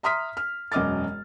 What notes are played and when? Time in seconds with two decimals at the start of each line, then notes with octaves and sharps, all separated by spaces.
0.03 E5 A#5 C6 D#6 F6 B6
0.37 F6
0.72 E1 F#2 D#5 D6 F6 A6